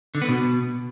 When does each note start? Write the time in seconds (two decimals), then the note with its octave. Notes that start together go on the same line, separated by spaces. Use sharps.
0.15 D3
0.22 B3
0.29 B2